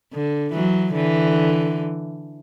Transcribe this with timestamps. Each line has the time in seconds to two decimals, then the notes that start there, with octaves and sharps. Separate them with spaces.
0.13 D3
0.53 E3 F#3
0.94 D3 E3